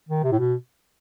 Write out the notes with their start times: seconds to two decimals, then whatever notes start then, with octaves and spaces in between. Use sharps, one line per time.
0.09 D#3
0.23 C3
0.32 A2
0.39 B2